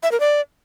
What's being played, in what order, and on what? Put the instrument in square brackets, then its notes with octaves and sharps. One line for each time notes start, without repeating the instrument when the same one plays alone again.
[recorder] E5
A#4
D5